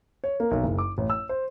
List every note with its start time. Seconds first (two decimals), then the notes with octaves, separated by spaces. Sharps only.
0.24 C#5
0.40 A#3
0.51 B1
0.63 F#1
0.79 D6
0.98 A1
1.10 E6
1.29 C5